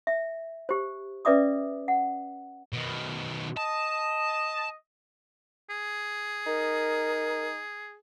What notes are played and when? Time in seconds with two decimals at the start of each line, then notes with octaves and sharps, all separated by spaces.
0.07 E5
0.69 G4 C5
1.25 C#4 B4 D5 E5 D6 D#6
1.88 F#5
2.73 B2 D#3
3.57 D#5 A5
5.70 G#4
6.46 D#4 A#4